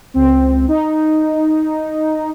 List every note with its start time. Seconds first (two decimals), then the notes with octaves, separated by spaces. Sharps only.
0.14 C#2 C4
0.68 D#4